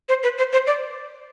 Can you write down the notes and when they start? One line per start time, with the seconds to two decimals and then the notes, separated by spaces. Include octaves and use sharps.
0.09 C5
0.23 B4
0.38 C5
0.52 C5
0.67 D5